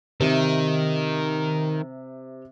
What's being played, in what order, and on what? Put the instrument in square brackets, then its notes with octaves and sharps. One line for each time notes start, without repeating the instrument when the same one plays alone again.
[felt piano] C3 E5 D#7 [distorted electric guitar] D#3